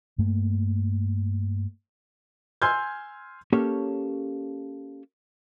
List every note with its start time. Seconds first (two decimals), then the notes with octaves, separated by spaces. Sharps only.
0.18 G2 A3 A#3
2.62 G#5 C6 E6 F6 G6 G#6
3.53 A#3 C#4 G4 A4 C#5